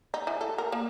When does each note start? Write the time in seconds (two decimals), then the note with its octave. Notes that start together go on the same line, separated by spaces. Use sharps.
0.14 D#4
0.27 E3
0.41 A4
0.58 A#4
0.72 A#3